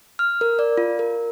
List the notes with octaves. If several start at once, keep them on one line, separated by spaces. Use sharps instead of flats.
F6
A#4
D5
F4
A#4